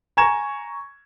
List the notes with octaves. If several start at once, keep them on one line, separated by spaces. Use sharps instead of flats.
G#5 A#5 C#6 G#6 E7